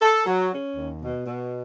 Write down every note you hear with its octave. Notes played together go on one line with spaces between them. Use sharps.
A4
F#3
C#4
D#2
B2
B2